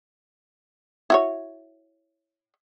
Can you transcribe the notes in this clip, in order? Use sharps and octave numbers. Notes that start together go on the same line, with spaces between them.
E4 F#4 C#5